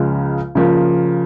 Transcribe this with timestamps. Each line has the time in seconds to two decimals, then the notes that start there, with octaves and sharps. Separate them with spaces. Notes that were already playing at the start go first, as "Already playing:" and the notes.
Already playing: C#2 C#3 F3 G#3
0.55 C#3 F3 A#3